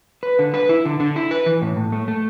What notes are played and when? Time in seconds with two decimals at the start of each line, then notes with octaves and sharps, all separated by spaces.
0.23 B4
0.39 D3
0.54 B4
0.69 E4
0.85 D3
1.00 D3
1.16 E4
1.31 B4
1.46 E3
1.62 A2
1.77 A2
1.92 A3
2.08 A3